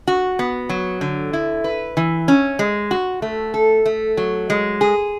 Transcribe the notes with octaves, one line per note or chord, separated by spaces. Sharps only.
F#4
B3
F#3
D3
E4
B4
E3
C#4
G#3
F#4
A3
A4
A3
F#3
G#3
G#4